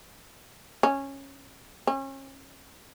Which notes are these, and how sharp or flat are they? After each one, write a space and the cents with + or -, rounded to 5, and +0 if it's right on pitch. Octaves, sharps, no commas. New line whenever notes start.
C#4 -10
C#4 -35